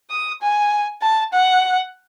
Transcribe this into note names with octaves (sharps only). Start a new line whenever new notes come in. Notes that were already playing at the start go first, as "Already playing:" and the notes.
D#6
G#5
A5
F#5